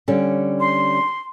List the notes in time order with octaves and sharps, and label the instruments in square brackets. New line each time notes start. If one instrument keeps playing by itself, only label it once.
[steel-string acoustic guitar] D3 G3 C#4
[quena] C6